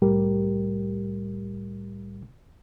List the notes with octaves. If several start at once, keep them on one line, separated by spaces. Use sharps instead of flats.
C2 A2 G3 G4 A#4